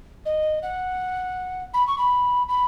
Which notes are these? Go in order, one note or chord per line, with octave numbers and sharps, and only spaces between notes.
D#5
F#5
B5
C#6
B5
B5